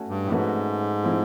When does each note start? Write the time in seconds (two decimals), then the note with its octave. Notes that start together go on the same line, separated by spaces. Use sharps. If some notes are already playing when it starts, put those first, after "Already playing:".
Already playing: A3 C#4 F#4
0.08 G2
0.25 A2
0.32 G#2 A3 C#4 F#4 B4
1.04 F3 A3 C4 E4